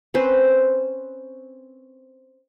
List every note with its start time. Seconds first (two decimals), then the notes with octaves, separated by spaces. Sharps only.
0.14 C4 C#4 B4 C5